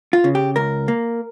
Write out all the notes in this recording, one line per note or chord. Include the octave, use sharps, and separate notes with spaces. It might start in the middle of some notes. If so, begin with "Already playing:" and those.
F4
C#3
G4
C#2 A#4
A#3